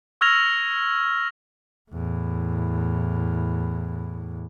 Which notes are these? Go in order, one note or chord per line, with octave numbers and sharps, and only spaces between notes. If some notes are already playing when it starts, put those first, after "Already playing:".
C#6 E6 F6 G#6 A#6 F7
E2 A2